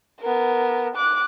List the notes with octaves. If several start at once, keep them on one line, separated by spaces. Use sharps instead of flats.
B3 A#4
D6 F#6